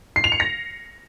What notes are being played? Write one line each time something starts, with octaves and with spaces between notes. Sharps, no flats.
C7
F7
C#7
A#6